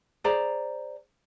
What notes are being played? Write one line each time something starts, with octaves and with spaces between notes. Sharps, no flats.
G#4 C5 D5 A#5